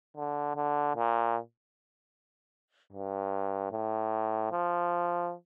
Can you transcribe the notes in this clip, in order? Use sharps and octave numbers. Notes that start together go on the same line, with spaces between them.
D3
D3
A#2
G2
A2
F3